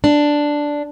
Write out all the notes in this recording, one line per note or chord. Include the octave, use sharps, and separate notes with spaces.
D4